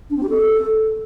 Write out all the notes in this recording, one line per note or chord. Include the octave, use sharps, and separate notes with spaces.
D4
C4
G4
A4